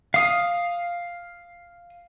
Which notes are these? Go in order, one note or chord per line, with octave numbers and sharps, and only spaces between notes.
F5 D#6